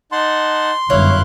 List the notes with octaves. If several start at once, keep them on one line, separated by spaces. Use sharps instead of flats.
D#4 F#5 A5 C6
G1 F#2 E4 C#5 F5 F#6